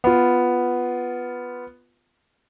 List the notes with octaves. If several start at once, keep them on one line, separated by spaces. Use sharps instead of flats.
B3 F4